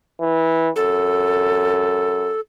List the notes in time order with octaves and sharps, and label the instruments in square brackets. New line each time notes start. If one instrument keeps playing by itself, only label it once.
[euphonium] E3
[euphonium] F#2 [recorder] A4